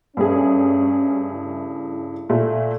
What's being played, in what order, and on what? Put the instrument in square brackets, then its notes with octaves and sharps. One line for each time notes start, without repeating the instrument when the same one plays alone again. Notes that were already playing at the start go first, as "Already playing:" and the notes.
[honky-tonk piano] G2 A3 G#4 [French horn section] C#4
[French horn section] C#3 E4
[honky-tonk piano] A#2 A3